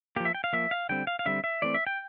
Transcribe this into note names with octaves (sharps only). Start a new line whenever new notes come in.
F3 A#3 G4
E5
G5
F5
F3 A#3 E5
F5
D3 G3 C4 G5
F5
F5
D3 G3 C4 E5
E5
E3 A3 C4 D5
E5
G5